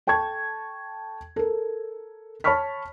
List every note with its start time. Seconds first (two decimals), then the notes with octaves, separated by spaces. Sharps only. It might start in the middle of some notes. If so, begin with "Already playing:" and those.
0.07 A4 G5 A5 C#6 G#6
1.36 A4 A#4
2.44 C#5 A5 B5 C#6 F6 B6